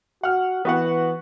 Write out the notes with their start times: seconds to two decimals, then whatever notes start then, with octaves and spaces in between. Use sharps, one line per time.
0.23 F#4 F#5 F6
0.65 E3 B3 F#4 F#5